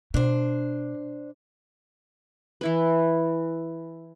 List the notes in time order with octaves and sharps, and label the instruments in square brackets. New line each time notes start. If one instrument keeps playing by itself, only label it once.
[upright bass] B2 [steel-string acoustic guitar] D4 C5
[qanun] E3 E4 B4